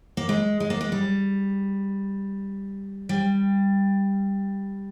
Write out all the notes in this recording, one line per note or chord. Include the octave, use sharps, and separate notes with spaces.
A#3
G#3
G#3
A#3
G#3
G3
G3